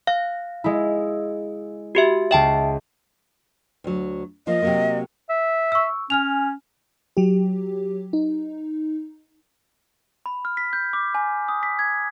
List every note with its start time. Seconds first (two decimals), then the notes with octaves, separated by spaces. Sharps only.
0.07 F5 F#6
0.64 G#3 E4
1.95 F#4 G4 E5
2.31 C#2 E5 G5 A5 E7
3.84 D2 F#3
4.47 F3 A#3 F4 D#5
4.62 C3 F#3 A#3
5.29 E5
5.72 C#6 E6
6.10 C#4 G#5 F6 F7
7.17 F#3 G4
8.13 D#4
10.26 B5
10.45 F6
10.57 B6
10.73 G6
10.93 D6
11.15 G#5
11.48 D#6
11.63 B6
11.79 G#6